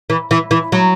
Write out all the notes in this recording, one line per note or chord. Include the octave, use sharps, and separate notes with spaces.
E3
E3
E3
F#3